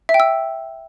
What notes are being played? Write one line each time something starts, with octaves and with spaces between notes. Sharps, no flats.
E5
G5
E6